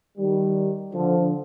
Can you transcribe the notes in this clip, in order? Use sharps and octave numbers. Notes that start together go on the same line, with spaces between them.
D#3 G3
D3 F3